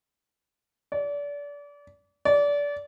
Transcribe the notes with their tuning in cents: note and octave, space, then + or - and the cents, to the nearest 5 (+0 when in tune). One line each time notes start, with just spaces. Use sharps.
D5 -30
D5 -25